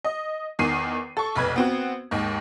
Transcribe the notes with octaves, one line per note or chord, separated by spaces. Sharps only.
D#5
E2 D#3 C7 D#7
A4 C#6
F1 B1 B4 G#6
B3 C4 F#4
D#2 G#2